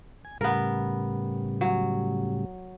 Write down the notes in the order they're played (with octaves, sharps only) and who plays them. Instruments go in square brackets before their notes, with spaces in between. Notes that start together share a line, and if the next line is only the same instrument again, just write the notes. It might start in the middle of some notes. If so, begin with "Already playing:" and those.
[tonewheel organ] G#5
[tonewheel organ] A2 C#3 G3 [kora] B3 A#4
[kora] F#3